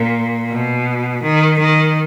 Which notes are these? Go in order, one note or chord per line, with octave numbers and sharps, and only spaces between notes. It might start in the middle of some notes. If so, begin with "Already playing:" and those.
Already playing: A#2
B2
D#3
D#3